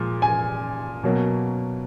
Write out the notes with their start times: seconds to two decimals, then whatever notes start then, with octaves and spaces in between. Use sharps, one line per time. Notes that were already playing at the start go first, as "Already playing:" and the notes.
Already playing: A#2 F3 G#3
0.22 G#5
1.03 B2 F#3 A#3